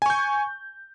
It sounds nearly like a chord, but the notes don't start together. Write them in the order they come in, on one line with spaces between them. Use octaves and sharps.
G#5 C#6 G6